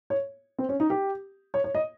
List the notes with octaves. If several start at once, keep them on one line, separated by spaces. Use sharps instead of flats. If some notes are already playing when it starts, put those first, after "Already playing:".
C#5
C4
C#4
D#4
G4
C#5
C#5
D#5